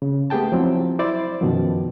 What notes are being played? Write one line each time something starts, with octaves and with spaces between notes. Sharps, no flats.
C#3
A3 B3 G4 G#4 G5 A5
F3 F#3 C4 E4
E4 C5 D5 A6
F#2 B2 D#3 F3